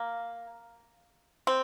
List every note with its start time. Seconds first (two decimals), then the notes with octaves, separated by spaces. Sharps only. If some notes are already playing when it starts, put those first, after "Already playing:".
Already playing: A#3
1.47 C4